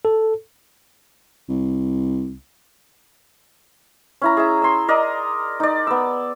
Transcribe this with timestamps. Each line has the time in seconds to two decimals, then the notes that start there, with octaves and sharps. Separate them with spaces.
0.05 A4
1.49 C2
4.21 C#4 E4 A#5
4.37 G#4 E5
4.62 C6 E6
4.88 A#4 D5 D#5
5.60 D#4 D5
5.87 B3 E6